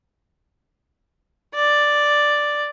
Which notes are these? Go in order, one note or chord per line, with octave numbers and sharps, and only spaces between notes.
D5